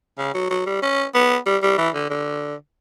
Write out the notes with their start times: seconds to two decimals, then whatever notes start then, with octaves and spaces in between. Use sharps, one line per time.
0.18 C#3
0.34 F#3
0.50 F#3
0.66 G3
0.82 C#4
1.15 B3
1.46 G3
1.63 G3
1.78 E3
1.94 D3
2.10 D3